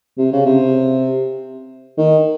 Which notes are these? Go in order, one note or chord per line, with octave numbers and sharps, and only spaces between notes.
C3
C#3
C3
D#3